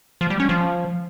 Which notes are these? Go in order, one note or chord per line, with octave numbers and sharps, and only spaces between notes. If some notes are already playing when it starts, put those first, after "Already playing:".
F3
G3
C#4
F3